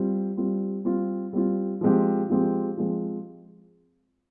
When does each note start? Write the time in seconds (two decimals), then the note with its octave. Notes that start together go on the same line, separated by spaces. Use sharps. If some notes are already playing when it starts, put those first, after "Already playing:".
Already playing: G3 C4 F4
0.37 G3 C4 F4
0.85 G3 C4 F4
1.33 G3 C4 F4
1.81 F3 G#3 C4 G4
2.29 F3 G#3 C4 G4
2.77 F3 G#3 C4